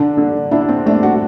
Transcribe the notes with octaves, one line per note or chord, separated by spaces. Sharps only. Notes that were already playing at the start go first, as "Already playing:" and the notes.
Already playing: D3 D4
D3
D4 E4
C4
A3 D4
F#4